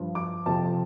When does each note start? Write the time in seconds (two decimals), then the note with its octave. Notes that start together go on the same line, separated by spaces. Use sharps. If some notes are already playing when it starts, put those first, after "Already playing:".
Already playing: G2 F3
0.15 D6
0.46 F2 C3 F3 A5